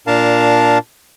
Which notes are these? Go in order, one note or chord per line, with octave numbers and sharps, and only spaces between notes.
A#2 D4 A#4 F5 A5